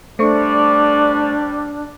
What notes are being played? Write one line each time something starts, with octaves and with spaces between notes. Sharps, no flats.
G3 A3 D4 C5 D5 C#6